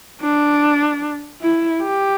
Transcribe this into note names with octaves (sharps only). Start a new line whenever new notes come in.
D4
E4
G4